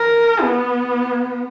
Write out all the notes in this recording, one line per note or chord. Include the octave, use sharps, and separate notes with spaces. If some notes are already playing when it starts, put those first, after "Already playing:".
Already playing: A#4
B3